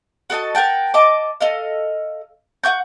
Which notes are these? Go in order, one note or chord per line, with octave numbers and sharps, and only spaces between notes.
F#4 A4 D#5 A5
A#4 F#5 G5 A5
D#5 A5 D6
A4 D#5 F5
F#5 G5 C#6 G6